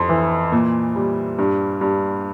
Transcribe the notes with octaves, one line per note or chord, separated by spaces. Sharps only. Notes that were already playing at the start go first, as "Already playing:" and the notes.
Already playing: F2 C6
E3
A#2
G3
G2
G2